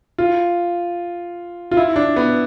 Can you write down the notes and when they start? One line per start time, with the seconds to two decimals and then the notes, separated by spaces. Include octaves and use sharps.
0.18 F4
1.71 F4
1.77 E4
1.96 D4
2.16 B3